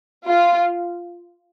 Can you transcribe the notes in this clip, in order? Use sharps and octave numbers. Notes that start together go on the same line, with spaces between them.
F4